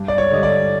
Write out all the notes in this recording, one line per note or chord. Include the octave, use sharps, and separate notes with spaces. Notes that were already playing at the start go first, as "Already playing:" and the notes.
Already playing: G2
D5
C#5
D3 G3 D#5
D5